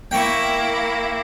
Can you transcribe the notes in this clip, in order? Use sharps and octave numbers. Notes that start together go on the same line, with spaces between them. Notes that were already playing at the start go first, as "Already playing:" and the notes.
A#3 E4 G5 C#6